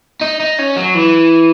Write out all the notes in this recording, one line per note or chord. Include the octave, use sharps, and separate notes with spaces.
D#4
D#4
C#4
F#3
E3